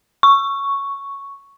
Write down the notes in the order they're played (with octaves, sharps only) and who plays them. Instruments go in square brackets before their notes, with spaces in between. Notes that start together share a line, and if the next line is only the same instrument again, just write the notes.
[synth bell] C#6